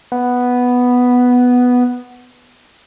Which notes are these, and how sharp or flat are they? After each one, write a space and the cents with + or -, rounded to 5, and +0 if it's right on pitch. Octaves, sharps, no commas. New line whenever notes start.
B3 +0